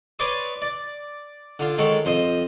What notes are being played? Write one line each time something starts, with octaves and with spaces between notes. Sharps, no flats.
B4 C#5 D5 C6 D#6
D5
D3 F4
D#3 G#3 A4 C#5
F2 C5 D#5 D#6